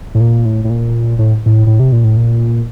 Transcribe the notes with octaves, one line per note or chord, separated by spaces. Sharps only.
A2
A#2
A2
A2
A#2
A2
A2
A2
C3
A#2
A2
A#2